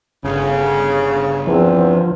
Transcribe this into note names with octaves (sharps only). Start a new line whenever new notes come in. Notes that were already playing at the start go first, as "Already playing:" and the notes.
G1 C#3
E2 E3 F3 C4